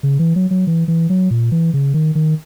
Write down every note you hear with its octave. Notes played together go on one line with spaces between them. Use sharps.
C#3
E3
F#3
F#3
E3
E3
F#3
A#2
E3
C#3
D#3
D#3